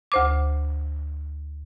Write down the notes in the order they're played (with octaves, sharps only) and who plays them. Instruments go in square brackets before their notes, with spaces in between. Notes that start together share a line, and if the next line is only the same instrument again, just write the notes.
[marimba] D2 C5 D6